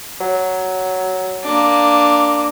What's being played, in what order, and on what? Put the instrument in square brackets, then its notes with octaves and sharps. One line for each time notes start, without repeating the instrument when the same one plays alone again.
[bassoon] F#3
[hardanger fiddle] A#3 D4